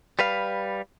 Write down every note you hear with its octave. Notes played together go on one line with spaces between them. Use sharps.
G3 B4 F5